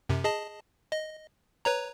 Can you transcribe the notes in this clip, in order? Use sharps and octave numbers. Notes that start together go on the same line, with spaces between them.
F#2 C3
G#4 D#5 A5
D#5
B4 C#5 A#5